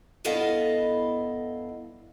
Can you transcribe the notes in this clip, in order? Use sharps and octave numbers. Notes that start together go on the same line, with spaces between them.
G2 B3 E4 A4 D#5 F5